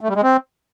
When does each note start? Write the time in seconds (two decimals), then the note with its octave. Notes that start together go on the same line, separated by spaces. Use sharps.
0.01 A3
0.08 G3
0.16 G#3
0.23 C4